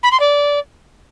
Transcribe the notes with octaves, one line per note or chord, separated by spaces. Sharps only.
B5
C6
D5